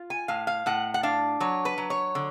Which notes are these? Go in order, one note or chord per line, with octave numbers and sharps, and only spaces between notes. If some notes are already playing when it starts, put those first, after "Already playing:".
Already playing: F4
G#5
A2 F5
F5
A2 F#5
F#5
D4 F5
F#3 C#5
B4
F#3
C#5
D3